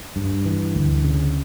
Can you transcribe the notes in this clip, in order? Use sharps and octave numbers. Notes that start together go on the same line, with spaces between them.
G2
E3
D2
C#3